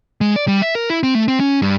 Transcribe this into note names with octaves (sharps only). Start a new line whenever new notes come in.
G#3
D5
G3
E5
A#4
E4
C4
A3
C4
C#4
G2